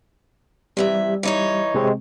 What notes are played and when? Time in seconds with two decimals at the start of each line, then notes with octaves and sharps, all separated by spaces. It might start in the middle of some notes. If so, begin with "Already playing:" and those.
0.77 C3 E3 G3 E5
1.23 E3 D#4 C#5
1.74 C3 G#3 C4